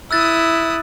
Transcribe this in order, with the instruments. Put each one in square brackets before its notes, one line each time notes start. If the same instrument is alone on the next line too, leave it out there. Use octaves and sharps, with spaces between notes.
[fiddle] E4 D#6 [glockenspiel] E6 F#6 A6